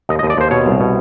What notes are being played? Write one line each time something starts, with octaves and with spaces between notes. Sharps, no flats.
D#2 D#5
D#5
D#2
D5
D#2 C5
B2 C#5
C2
B2